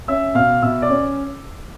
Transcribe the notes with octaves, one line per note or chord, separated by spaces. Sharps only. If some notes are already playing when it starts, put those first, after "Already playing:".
C#4 E5 E6
B2 F5 F6
B2 E5 E6
D5 D6
C#4